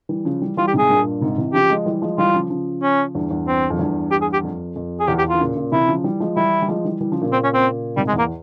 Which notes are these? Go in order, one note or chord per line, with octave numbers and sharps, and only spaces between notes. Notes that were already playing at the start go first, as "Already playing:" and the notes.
E3 G3
C#3 F3
E3 G3
E3 G3 F4
G4
G#2 C3 G#4
G2 A#2
G#2 C3
C3 E3
C#3 F3 G4
F3 G#3
E3 G3
F3 G#3
E3 G3 F4
C#3 F3
C#3 F3
C#4
E2 G2
E2 G2
C4
F2
E2 G2
G4
G#4
G4
F2
F2
G#4
E2 G4
G4
E2
E3 F4
A#2 C#3
A#2 C#3
C3 E3 E4
C#3 F3
E3 G3
F3 G#3
E3 G3 E4
G3
F3 G#3
E3 G3
E3 G3
C#3 F3
A#2 C#3
C4
C#4
C4
G#2 C3 G3
G#3
E2
A#3